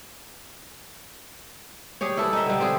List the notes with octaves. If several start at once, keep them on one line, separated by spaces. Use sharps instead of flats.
G3 G4 G#4 C#5
E4 A4 B4
D#4 D#5 E5
D3 G3
C4 G4 G#4